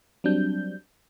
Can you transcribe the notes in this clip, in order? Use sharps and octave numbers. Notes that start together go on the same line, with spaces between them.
F#3 G3 C4 D4 G6